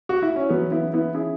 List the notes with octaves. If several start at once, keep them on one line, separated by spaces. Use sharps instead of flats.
F#4
E4
C#4
E3 F#3 B3
B3 E4
C#4
B3 E4
C#4 E4 G#4